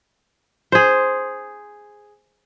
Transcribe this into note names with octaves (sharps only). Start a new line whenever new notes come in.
G#4 C5